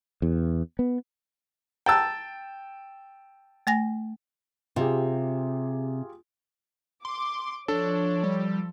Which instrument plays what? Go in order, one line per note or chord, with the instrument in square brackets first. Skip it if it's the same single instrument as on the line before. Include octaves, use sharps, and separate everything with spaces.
[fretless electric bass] E2
B3
[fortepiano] G5 A5 E6 [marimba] A#5 F#6
[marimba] A3 G#5 A#6
[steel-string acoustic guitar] C3 [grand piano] F4 G4 G#4
[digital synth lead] C6 [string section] D6
[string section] F3 [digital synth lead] D4 [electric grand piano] A4 [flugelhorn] C#5
[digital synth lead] G3